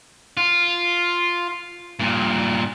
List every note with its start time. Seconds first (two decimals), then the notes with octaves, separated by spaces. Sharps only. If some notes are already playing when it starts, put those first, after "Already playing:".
0.37 F4
2.00 G2 A#2